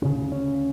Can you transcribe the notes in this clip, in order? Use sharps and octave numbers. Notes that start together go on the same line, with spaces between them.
D2 C#3 C#4
C#4